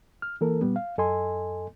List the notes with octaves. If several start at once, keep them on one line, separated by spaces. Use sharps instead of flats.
F6
E3 A#3 A4 A#4
A#2 G3 B3
F5
F#2 A4 D#5 G#5 C6